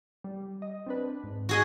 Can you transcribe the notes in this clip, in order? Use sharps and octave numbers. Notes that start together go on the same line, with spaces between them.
G3
D#5
C4 D4 B4
G#2
F#4 G#4 D#5